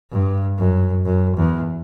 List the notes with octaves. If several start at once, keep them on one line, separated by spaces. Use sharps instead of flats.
G2
F#2
F#2
E2